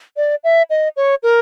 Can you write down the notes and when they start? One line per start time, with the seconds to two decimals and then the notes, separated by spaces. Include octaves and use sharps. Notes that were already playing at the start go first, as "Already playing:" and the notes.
0.17 D5
0.44 E5
0.70 D#5
0.96 C#5
1.23 A#4